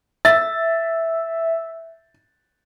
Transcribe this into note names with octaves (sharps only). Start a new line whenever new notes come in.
E5 A6